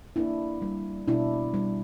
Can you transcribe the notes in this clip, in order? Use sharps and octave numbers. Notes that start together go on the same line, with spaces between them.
A#3 D4 E4
G3
B2 D4 E4
G3